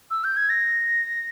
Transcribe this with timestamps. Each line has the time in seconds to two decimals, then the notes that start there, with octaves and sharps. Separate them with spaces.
0.11 E6
0.24 G6
0.37 G#6
0.50 A#6